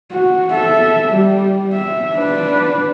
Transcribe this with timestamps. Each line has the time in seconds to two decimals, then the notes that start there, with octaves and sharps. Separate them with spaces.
0.12 F#4
0.52 A4 E5
1.09 G3
1.73 E5
2.14 D4 B4